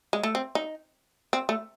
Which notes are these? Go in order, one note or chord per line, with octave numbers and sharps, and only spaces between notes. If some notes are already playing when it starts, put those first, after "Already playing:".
G#3
A3
C4
D#4
C4
A3